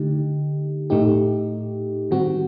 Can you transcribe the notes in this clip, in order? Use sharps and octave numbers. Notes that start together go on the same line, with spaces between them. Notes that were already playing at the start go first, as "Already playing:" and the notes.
Already playing: D3 A3 D#4 G4
A2 A3 D#4 G4
D#3 G3 C4 F#4